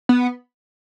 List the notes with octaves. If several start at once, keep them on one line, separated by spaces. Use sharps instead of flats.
B3